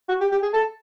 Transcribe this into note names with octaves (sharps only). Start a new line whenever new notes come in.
F#4
G4
G4
G#4
A4